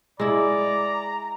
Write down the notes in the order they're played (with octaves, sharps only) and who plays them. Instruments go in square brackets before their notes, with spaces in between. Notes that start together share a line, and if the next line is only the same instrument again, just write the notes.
[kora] G#3 E4 [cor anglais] D5 [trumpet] A#5